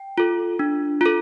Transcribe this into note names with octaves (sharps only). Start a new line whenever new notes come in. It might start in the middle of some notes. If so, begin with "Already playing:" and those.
Already playing: G5
F4 A4
D4
F4 A4